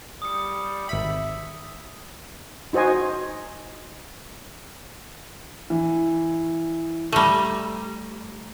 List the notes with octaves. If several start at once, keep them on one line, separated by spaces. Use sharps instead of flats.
G3 D#6 C#7
G#1 E5 B5
D#4 F#4 C5 D#5 G#5
E3
G3 A3 A#5 A#6 D#7